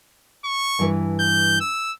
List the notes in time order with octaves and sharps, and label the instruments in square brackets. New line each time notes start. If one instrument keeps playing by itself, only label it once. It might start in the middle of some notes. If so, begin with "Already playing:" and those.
[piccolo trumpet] C#6
[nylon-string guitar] G2 E3 B4
[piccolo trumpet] G6
E6